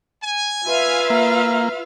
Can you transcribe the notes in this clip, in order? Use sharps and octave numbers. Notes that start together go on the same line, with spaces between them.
G#5
F4 B4 E5 F5
A#3